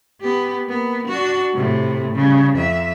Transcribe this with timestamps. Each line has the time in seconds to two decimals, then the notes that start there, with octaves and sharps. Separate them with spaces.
0.21 B3 G4
0.65 A#3 B3
1.08 D4 F#4
1.54 A2 C3
2.14 C#3 G3
2.55 F2 E5